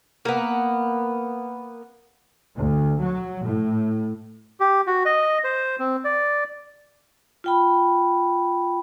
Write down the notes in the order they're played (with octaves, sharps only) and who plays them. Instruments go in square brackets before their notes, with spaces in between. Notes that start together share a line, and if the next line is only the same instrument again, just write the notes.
[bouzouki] A#3 B3
[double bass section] D2
F#3
A2
[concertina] G4
F#4
D#5
C5
C4
D5
[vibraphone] F4 G5 B5